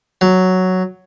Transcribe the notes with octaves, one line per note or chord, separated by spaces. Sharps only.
F#3